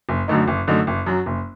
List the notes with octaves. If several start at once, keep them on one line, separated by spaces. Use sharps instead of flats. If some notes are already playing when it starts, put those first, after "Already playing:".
F#1
F#2 D3 A3 D#4
F#1
F#2 D3 A3 D#4
F#1
F#2 F#3
F#1